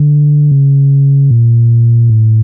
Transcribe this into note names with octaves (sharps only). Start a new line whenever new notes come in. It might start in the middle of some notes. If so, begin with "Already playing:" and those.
Already playing: D3
C#3
A#2
A2